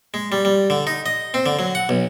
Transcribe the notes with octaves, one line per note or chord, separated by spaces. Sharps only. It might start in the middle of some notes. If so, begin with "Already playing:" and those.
G#3
G3
G3
D3
D#4
D#5
C4
D3
F#3
F#5
B1